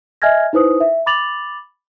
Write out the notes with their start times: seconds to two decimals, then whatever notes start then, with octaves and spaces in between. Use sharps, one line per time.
0.22 D#5 E5 G#5 F6 G#6 A#6
0.53 D#4 E4 B4 C5 D#6
0.80 E5
1.06 B5 D6 A6 F7 F#7